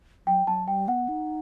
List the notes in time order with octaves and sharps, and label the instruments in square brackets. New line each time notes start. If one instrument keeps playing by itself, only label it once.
[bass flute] F#3 [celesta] G5
[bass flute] F#3 [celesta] A5
[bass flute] G3 [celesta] G5
[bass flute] B3 [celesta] F#5
[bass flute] D#4